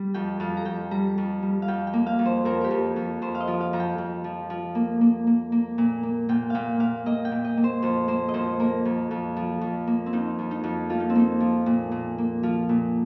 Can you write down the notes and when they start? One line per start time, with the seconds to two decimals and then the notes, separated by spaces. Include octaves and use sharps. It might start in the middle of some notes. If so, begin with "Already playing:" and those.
Already playing: G3
0.14 F2 G5
0.40 F2 F5
0.57 A#5
0.65 F2 G5
0.91 G3 A#5
1.18 F2
1.42 G3
1.62 F5
1.68 F2 G5
1.87 G5
1.93 A#3
2.06 F5
2.19 F2
2.25 C5
2.45 F2 A#4
2.61 G4 A#4
2.71 F2
2.96 F2
3.22 F2 C5
3.35 F5
3.40 D#5
3.48 F3
3.60 F5
3.73 F2 A#5
3.80 G5
3.98 F2
4.24 F3
4.50 F3
4.75 A#3
5.01 A#3
5.27 A#3
5.52 A#3
5.78 A#2
6.03 A#3
6.29 A#2 G5
6.50 A#2 F5 G5
6.80 A#2 F5
7.06 A#3 D#5
7.25 G5
7.32 A#2
7.44 D#5
7.57 A#3
7.64 C5
7.82 F2 C5
8.08 A#3 C5
8.29 D#5
8.34 F2 C5
8.60 A#3 A#4
8.85 F2
9.11 F2
9.37 F3
9.61 F2
9.87 A#3
10.06 C4
10.13 F2 D#4
10.39 F2
10.51 D#4
10.64 F2
10.89 A#3 F4
11.00 D#4
11.10 C4
11.15 A#3 D#4
11.40 F3
11.66 A#2
11.92 A#2
12.18 A#3
12.43 F3 F4
12.69 A#2